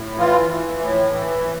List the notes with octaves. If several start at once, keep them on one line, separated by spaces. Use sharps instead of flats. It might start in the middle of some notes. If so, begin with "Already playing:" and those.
Already playing: A2
E3 F4
E3
A2
E3